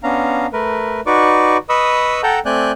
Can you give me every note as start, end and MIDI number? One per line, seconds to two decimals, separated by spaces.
0.03 0.47 59
0.03 0.47 61
0.03 0.47 62
0.03 0.47 77
0.03 0.47 82
0.53 1.00 57
0.53 1.00 70
0.53 1.00 71
1.06 1.57 63
1.06 1.57 66
1.06 1.57 71
1.06 1.57 74
1.06 1.57 85
1.06 1.57 86
1.69 2.21 71
1.69 2.21 75
1.69 2.21 83
1.69 2.21 85
1.69 2.21 87
1.69 2.21 88
2.23 2.39 69
2.23 2.39 78
2.23 2.39 79
2.23 2.39 81
2.23 2.39 82
2.23 2.39 91
2.46 2.72 57
2.46 2.72 60
2.46 2.72 74
2.46 2.72 80
2.46 2.72 90
2.46 2.72 91